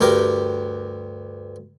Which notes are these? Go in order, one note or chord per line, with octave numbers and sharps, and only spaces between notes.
D2 G2 G4 A#4 G5